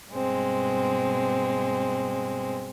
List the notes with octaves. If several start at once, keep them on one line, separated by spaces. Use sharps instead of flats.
G2 B2 G#3 C4